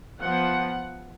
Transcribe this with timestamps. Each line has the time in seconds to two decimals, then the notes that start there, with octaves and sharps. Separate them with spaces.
0.22 F3 B3 F#5